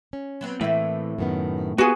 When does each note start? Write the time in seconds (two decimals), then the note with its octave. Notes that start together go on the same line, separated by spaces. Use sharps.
0.13 C#4
0.41 F#3 B3 C4
0.61 A2 E3 A#3 C4 E5
1.18 F#2 D#3 B3
1.78 A#3 B3 F4 F#4 G#4